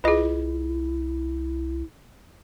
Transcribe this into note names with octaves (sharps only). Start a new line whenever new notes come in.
C2 E4 F4 G#4 B4 D#5